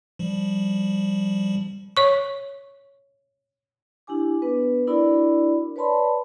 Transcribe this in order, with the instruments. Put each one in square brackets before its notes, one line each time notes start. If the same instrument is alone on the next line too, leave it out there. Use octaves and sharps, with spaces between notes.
[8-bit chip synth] F3 G3
[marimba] C#5 C#6
[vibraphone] D4 E4 G4 G#5 D6
B3 D4 B4
D4 E4 F#4 A#4 D5 B5
B4 C#5 D5 A5 B5 C6